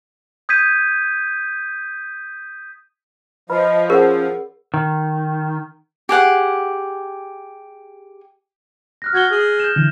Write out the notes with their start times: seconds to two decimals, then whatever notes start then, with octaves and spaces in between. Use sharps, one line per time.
0.49 D#6 G6 G#6 B6 D#7
3.50 F3 B4 D#5 B5
3.90 C#4 G#4 A#4 C#5 F#5
4.74 D#3
6.09 G4 G#4 F#5 D6
9.02 F6 F#6 A#6
9.14 F#4 G#6 A#6 G7
9.31 G#4
9.60 G6 E7
9.76 D3 E3